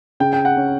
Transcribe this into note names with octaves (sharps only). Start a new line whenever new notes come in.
C#3 G5
G5
F#5
C#4